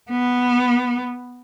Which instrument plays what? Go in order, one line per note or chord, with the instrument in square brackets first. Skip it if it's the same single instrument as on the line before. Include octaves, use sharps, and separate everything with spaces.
[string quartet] B3